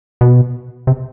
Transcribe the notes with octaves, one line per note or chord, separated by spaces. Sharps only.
B2
C3